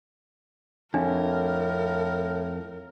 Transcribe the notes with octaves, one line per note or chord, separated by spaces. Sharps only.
F2 A2 D4 A#4